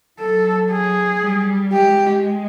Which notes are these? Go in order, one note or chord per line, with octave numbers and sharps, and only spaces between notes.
F#3 A4
G#4
G3
G#3 G4